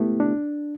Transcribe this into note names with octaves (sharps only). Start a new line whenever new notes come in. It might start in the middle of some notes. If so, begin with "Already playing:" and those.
Already playing: A3 B3 E4 G4
D4